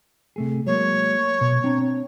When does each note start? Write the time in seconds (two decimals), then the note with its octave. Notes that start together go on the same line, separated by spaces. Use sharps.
0.36 C3 A3 G#4
0.67 F#3 G#3 A#3 C#5
1.41 B2
1.64 C4 D4 A#5